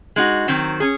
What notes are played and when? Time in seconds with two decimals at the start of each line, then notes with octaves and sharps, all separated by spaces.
0.16 G#3 D#4 F#4
0.48 D#3 F#3 C4
0.80 C#4 G#4